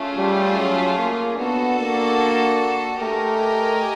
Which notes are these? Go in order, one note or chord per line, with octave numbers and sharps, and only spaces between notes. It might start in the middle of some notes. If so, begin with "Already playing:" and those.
Already playing: A3 C#4 F4 G#4
G3
F#3
A#3
B3 D4 F#4 A4
A#3
A3 G4 A#4 D#5 G#5